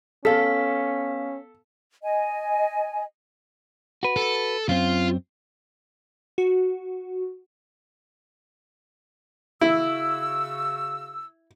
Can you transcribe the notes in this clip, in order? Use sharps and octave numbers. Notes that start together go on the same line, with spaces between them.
B3 C#4 A4 F5 B6
D#5 G#5
F#4 B4
A4
F#2 C4 F4
F#4
C#3 E4 F#4 E6